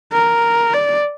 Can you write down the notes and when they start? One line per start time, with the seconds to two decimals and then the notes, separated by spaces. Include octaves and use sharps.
0.12 A#4
0.73 D5